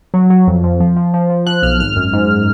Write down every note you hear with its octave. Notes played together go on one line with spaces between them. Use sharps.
F#3
F#3
F2
F2
F3
F3
F3
F3
F3 F#6
B1 F6
G#1 F6
F#2
G#2